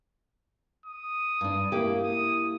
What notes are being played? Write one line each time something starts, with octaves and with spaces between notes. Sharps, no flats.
D#6
G2 D4
A#3 E4 G4
D#6